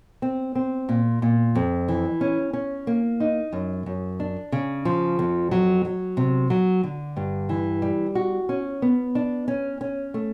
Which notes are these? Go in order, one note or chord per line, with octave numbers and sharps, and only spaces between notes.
C4
C4
A#2
A#2
F2
E3
C#4
C#4
A#3
D#4
F#2
F#2
D4
C#3
F3
F2
F#3
F#3
C3
F#3
D3
G2
E3
G3
F#4
C#4
B3
D4
C#4
C#4
A3